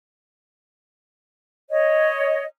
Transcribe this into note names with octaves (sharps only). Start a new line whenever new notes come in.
C#5 D#5